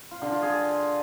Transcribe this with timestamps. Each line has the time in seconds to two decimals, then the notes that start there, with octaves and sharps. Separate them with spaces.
0.11 F4
0.22 D3
0.32 F4
0.43 G#4